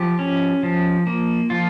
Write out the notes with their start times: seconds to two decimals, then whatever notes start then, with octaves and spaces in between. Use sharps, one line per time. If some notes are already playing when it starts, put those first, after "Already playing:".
Already playing: F3 G4
0.19 C#4
0.63 F3
1.07 A#3
1.50 F3 F4